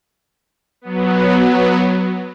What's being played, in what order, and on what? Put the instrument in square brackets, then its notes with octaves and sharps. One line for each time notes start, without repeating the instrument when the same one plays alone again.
[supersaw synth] F#3 B3